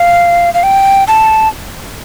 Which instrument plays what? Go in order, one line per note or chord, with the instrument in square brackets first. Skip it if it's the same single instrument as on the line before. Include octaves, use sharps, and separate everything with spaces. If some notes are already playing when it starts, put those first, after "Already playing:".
Already playing: [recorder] F5
F5
G5
A5